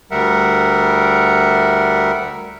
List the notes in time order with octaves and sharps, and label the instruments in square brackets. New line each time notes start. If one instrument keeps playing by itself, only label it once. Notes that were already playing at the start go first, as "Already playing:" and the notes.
[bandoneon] D2 G3 A#4 E5 F#5